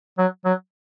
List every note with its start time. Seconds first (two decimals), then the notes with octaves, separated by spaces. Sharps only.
0.18 F#3
0.45 F#3